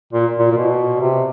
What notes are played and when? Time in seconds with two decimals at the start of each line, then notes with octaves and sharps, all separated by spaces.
0.13 A#2
0.39 A#2
0.52 A#2
0.57 B2
1.01 C3